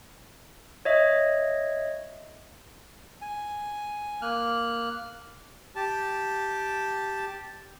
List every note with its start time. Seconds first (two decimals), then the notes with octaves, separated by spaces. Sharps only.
0.85 C#5 D#5 E5
3.22 G#5
4.22 A#3 F6 F#6
5.76 G4 A5